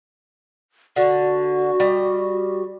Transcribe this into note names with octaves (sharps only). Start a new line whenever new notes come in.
D3 F#4
G3 D#5